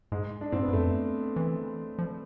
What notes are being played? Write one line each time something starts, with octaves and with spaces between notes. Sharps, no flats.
G#2 G#3
D4
G#2 C4
B3
G#2
F2 A3
E3
F3